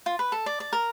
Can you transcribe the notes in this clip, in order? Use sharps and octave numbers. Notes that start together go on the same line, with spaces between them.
F4
B4
A4
D5
D5
A#4